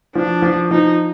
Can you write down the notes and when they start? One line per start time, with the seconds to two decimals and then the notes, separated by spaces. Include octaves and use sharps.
0.15 F3 D4
0.42 F3
0.71 F3 D#4